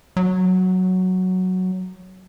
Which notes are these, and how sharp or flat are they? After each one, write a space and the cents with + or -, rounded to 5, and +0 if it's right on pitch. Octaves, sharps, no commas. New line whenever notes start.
F#3 +0